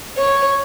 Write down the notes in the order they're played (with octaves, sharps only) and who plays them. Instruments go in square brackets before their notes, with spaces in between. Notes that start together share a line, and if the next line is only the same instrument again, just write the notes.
[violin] C#5